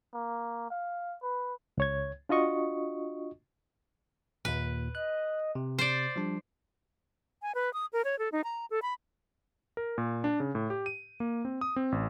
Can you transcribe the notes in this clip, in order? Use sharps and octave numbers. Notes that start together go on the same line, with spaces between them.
A#3
F5
B4
C#2 C#5 G#6
D4 F4 F#4 D#5 C#6
D#2 A#2 B4
D#5 F#6
C3
C5 D5 A6
F3 G3 D4
G#5
B4
D#6
A#4
C#5
A4
D#4
A#5
A4
B5
A#4
A#2
D4
C#3
A2
G4
D#7
A#3
C4
D#6
C4
A1